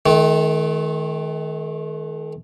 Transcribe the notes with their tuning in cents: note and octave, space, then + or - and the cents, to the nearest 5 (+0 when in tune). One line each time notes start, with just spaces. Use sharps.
D#3 +15 A3 -45